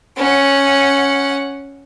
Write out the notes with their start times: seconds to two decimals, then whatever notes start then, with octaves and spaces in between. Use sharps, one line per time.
0.17 C#4 F#5